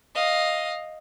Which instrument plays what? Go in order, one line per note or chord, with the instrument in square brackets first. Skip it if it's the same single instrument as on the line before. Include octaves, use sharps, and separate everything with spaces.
[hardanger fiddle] D#5 F5